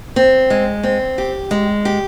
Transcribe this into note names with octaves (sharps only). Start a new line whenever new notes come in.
C4
G#3
C4
G4
G#3
G4